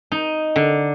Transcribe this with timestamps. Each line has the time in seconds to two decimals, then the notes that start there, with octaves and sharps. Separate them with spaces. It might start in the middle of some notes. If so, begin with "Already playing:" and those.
0.12 D#4
0.56 D3